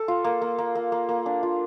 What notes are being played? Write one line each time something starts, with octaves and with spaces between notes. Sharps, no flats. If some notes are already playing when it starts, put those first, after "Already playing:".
Already playing: A4
F4
A#3
A#3
A#3
A#3
A#3
A#3
D4
F4